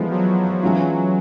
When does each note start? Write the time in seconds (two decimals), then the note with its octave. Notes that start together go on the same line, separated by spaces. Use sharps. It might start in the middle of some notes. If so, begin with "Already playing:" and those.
Already playing: E3 F3 G#3 B3 E4 A4
0.10 F#3
0.62 E3 F#3 G#3 C#4 F4